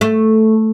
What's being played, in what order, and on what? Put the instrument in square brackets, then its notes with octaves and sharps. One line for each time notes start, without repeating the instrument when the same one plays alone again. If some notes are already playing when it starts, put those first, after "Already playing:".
[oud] A3